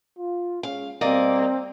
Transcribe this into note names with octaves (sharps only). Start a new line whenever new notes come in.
F4
G#3 C#4 F5
B2 G3 A#3 C4 D5 D#5